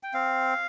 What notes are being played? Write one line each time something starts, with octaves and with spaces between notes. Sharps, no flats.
G5
C4 F5